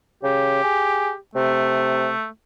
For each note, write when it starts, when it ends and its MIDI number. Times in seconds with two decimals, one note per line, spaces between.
0.23 0.59 49
0.23 1.16 67
0.64 1.11 68
1.35 2.12 48
1.35 2.27 57